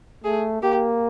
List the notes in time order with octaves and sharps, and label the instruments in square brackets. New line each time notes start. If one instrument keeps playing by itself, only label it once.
[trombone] A3 [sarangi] G#4
[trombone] A#3 [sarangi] G4